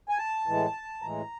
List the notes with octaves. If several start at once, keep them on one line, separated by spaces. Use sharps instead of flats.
G#5
A5
A2 E3 G#3
A2 E3 G#3 A#5